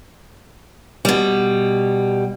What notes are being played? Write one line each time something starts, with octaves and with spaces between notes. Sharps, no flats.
B2 G3